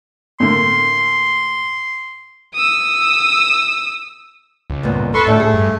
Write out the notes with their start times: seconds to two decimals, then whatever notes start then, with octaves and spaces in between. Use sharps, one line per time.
0.40 A2 D3 A#3 C6
2.54 D#6 E6
4.70 C#2
4.83 G2 A#2 B3
5.14 A4 B4 C6 C#6
5.27 D2 A2 D3 A3
5.40 G#4
5.54 G2